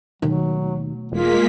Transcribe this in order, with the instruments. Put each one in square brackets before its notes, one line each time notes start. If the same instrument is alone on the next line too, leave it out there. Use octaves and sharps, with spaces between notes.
[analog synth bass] D#2 [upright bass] B2 A3 [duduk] F#3
[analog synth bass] E1 [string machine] G#3 A#3 B6 [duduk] F4